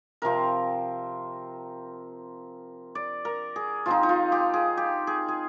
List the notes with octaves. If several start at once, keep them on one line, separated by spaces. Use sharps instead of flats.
C3 F3 C4 A#4
D5
A#4
G#4
F3 C4 D#4 F4
D#4
F4
G4
G#4
G4
G#4
G#4